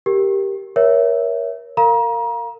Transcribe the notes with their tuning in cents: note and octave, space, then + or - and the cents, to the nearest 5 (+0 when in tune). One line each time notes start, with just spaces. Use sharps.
G4 +0 A#4 +0
A#4 +30 C#5 +0 E5 +0
A#4 -30 F5 +0 A#5 +30